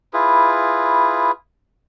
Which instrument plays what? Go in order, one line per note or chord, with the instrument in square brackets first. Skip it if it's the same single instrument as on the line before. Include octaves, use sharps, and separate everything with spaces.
[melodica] E4 F4 G#4 B4